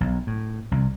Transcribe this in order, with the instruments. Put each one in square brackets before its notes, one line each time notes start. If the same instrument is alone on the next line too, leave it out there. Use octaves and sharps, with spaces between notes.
[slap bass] B1
A2
C2